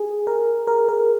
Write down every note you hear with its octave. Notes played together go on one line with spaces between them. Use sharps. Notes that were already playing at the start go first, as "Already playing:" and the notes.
Already playing: G#4
A#4
A#4
A#4